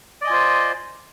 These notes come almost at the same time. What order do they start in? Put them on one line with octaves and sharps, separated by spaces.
D5 D#5 G#5 F4 C5